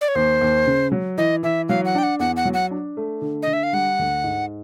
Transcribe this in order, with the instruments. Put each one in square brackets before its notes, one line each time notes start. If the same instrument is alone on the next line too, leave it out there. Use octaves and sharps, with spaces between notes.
[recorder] D5
C#5
[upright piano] D#2 [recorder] C5
[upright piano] D#2
C#3
F#3
[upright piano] E3 [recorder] D#5
[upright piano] E3 [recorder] E5
[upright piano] F#3 [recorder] F5
[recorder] F#5
[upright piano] D4 [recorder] G5
[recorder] F#5
[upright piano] E2 [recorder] F#5
[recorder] F#5
[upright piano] F#3
[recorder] F#5
[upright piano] D4
A3
D3
[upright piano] D3 [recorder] D#5
[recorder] E5
F5
[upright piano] G3 [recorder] F#5
[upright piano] D2
G#2